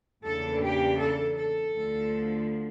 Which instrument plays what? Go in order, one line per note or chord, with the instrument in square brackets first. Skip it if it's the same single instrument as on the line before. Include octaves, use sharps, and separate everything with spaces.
[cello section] E2 C#3 E3 A#3 D4 A4
G4
A4
A4
D2 D3 F3